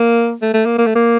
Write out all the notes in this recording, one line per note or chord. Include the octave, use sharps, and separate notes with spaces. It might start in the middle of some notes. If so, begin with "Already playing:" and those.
Already playing: A#3
A3
A3
A#3
A#3
A3
A#3